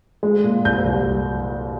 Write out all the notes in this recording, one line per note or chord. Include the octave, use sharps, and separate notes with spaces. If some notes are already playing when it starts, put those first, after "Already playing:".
G#3
A#2
C2 G6
C2